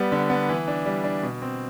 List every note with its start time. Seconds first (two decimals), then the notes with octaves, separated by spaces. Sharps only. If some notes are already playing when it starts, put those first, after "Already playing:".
Already playing: G3 B3
0.12 D3
0.30 B3
0.49 E3
0.68 D4
0.86 G3
1.04 D4
1.23 B2
1.42 C4